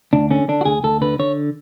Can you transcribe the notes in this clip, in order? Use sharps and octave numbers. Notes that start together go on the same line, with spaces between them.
D2 D4
D3 C#4
D3 D4
F#4
D2 G#4
D2 A4
D3 B4
D3 C#5